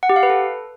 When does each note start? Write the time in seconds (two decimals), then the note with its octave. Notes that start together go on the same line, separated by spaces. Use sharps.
0.03 F#5
0.09 G4
0.16 F5
0.23 B4
0.30 A4